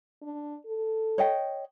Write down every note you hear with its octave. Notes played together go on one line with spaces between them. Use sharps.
D4
A4
C#5 D#5 G5